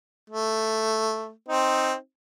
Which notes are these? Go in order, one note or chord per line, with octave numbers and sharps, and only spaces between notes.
A3
C4 D#4